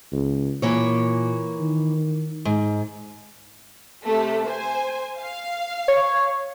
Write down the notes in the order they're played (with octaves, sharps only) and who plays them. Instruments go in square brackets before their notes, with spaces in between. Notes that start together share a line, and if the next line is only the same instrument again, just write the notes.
[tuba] C#2
[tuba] A#2 [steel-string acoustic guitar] E3 A#3 C#5
[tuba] D#3
[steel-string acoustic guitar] G#2
[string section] C3 A3
C5 G#5
F5
[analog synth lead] C#5